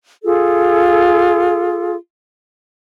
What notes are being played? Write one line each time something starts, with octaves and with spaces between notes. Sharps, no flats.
F4 G#4 A4